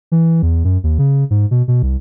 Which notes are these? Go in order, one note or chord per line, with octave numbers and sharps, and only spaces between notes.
E3
E2
F#2
D#2
C#3
G#2
B2
B2
C2